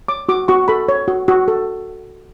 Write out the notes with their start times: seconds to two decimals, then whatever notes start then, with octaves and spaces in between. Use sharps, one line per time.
0.08 C#5 D6
0.29 F#4 D6
0.48 F#4 C#6
0.68 A4 B5
0.89 C#5
1.08 F#4
1.28 F#4
1.48 A4